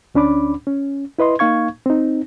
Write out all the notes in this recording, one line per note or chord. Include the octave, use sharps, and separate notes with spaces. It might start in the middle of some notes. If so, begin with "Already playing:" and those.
D2 C#4 D4 B5 D6
C#4
E4 B4 D#5 C6
A#3 D#4 F5 C#6 G#6
C4 D#4